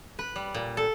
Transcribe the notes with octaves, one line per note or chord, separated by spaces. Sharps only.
B4
G3
A#2
A4